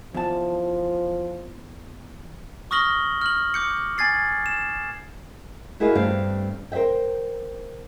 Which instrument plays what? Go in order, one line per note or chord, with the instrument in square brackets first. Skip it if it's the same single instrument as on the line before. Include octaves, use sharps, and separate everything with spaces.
[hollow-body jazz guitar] E2 A5 [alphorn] F3
[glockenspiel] C#6 D#6 F6 A#6 F#7 G7
F6 F#7
D6 G6 C#7
G#5 G#6 A6 C7
E7
[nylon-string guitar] E4 F#4 G#4 A#4 D#5 F5
G2 A3 C4 D5 F5
A#4 C5 C#5 E5 G5